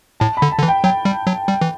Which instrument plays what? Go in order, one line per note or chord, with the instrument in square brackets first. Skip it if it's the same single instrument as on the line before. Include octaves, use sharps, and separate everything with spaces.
[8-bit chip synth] A2 [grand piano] A5
[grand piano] B5
[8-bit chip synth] D3
[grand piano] A5
[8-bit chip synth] D3
E3
[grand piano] G5
[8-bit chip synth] F#3 [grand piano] G5
[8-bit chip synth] G3
F#3
G3
E3